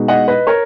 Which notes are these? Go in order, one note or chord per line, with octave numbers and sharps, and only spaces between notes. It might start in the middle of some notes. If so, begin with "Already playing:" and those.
Already playing: B2 G#3 D#4
D#5 F#5
B4 D#5
A#4 C#5